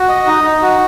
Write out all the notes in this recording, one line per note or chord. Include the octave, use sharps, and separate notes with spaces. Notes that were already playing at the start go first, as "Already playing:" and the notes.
Already playing: F#4
D#5
D#4
D#4
F#4